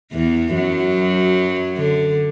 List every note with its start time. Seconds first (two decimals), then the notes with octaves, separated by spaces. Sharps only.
0.12 E2 E3
0.55 F#2 F#3
1.77 D3